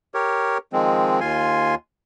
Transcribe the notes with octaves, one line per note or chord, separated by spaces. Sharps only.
G4 A#4 C#5
D#3 F3 G#3 C4
D#2 F4 G#5 C6